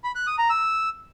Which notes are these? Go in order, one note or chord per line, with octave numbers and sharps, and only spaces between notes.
B5
F#6
D#6
A#5
E6